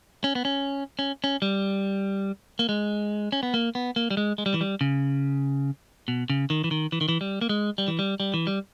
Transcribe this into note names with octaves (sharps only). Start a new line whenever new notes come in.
C#4
B3
C#4
C#4
C#4
G3
A#3
G#3
C#4
B3
A#3
B3
A#3
G3
G#3
G#3
G3
E3
G3
C#3
B2
C#3
D#3
E3
D#3
E3
D#3
E3
G3
A#3
G#3
G3
E3
G3
G3
E3
G3